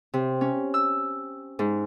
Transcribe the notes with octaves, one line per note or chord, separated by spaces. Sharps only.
C3
C#4
E6
G#2